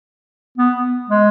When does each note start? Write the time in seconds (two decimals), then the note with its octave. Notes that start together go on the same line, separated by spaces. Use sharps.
0.58 B3
1.10 G#3